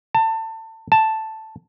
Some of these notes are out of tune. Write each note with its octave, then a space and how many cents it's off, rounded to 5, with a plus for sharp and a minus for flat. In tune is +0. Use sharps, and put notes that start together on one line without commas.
A5 +25
A5 +0